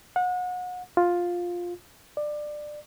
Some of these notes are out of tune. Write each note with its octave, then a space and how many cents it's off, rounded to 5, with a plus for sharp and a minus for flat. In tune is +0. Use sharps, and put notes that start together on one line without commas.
F#5 -30
F4 +10
D5 +20